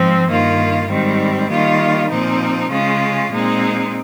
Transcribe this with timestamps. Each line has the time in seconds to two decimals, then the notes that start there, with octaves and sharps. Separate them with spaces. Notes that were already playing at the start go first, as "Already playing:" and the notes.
Already playing: G#2 F3 C4
0.28 G2 D#3 A#3 F4
0.88 G#2 D#3 G3 C4
1.49 D#3 G3 A#3 F4
2.09 A#2 F3 C4 D#4
2.70 C#3 G#3 C#4 F4
3.31 A#2 G#3 C4 D#4